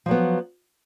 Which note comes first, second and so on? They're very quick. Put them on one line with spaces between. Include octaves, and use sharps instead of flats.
F3 F#3 B3